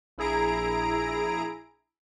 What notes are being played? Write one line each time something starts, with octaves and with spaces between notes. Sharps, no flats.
A#1 E4 G#4 A#5 D7